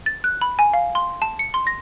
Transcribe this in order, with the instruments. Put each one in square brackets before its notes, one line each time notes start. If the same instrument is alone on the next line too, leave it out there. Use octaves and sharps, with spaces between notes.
[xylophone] A6
F#6
B5
G#5
F5
C6
A5
C#7
C6
A#6